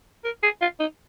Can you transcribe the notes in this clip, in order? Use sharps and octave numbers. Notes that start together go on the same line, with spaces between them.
A#4
G#4
F4
D#4